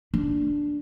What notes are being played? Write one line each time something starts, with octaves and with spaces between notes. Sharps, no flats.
D4